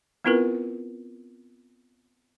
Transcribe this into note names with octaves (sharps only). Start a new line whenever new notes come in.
B3 C4 E4 F4 A#4 B4